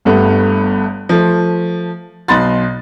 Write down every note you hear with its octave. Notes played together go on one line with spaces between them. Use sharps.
G1 G2 A3 B3
F3 A3
B1 B2 B5 C6 A6